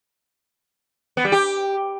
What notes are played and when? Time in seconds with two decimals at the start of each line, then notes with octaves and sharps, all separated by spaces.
1.17 B3
1.25 G3
1.32 G4